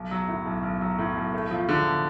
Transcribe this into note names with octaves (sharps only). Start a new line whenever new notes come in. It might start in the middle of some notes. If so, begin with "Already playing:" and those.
Already playing: B1
F#3
A2
B1
B1
F#3
A2
B1
A3
F3
D3